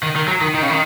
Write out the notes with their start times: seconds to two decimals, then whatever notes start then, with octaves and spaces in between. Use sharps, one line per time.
0.03 D#3
0.16 D#3
0.28 F#3
0.41 D#3
0.54 D#3
0.62 C#3
0.70 D#3